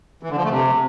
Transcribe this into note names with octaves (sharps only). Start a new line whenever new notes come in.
E3
D3
F3
A3
C3